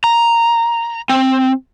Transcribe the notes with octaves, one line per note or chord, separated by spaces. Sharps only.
A#5
C4